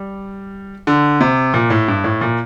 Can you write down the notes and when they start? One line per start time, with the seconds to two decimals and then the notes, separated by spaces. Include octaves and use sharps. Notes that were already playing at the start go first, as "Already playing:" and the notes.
Already playing: G3
0.87 D3
1.21 C3
1.54 A#2
1.70 A2
1.88 G2
2.04 A2
2.21 A#2